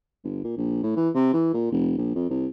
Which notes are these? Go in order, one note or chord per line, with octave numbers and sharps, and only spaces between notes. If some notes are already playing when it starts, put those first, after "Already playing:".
G1
A#2
A#1
A2
E3
C3
E3
A#2
F1
A#1
F2
C2